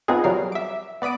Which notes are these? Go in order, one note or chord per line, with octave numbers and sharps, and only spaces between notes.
B3 C4 D#4 F4 G#4
F#3 G3 A#4 F5
E5 D6
B3 D5 B5 D#6 D7